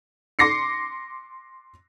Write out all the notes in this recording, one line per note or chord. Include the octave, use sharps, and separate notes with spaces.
C6 D6 A#6 C7 C#7